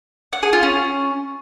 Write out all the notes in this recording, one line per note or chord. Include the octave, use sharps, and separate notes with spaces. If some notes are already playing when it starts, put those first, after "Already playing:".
F#5
G#4
F4
C#4